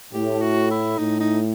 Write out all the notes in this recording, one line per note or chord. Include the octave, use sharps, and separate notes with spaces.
A2 G4
F#4
E4
A2 D#4
D#4